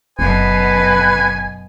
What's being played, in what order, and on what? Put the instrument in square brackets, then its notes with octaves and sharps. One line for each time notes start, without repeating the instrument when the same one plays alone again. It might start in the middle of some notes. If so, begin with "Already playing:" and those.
[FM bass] F#1 [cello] F#2 B2 [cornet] B4 [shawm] G#5